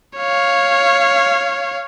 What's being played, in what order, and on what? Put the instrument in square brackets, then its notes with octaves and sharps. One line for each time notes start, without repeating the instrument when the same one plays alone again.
[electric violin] C#5 F5